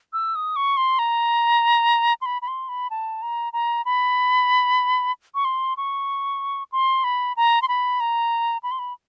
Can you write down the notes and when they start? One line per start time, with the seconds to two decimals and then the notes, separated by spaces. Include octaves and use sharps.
0.13 E6
0.35 D#6
0.56 C#6
0.77 C6
0.99 A#5
2.22 C6
2.26 B5
2.42 B5
2.48 C6
2.68 B5
2.90 A5
3.22 A#5
3.53 A#5
3.85 B5
5.35 C#6
5.45 C6
5.77 C#6
6.72 C6
7.04 B5
7.37 A#5
7.62 C6
7.68 B5
8.00 A#5
8.63 B5
8.71 C6
8.79 B5